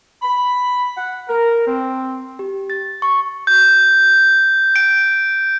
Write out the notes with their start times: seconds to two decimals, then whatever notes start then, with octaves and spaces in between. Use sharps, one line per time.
0.23 B5
0.98 F#5
1.29 A#4
1.68 C4
2.39 G4
2.70 A6
3.02 C#6
3.47 G6
4.76 D7